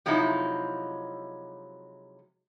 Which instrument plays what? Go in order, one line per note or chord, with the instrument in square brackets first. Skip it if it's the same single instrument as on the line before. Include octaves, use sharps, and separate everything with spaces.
[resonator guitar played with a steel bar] C3 F3 F#3 G#3 D#4 E4